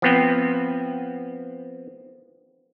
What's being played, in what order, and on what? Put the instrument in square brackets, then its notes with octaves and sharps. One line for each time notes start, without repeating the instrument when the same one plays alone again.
[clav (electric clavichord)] F3 B3 C4